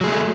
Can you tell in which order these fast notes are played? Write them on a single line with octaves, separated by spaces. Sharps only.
F#3 G#4 A3